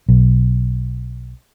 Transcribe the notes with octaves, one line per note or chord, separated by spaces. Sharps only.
B1